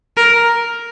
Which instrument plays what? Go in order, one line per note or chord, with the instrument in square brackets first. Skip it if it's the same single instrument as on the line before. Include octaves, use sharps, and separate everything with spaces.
[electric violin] A#4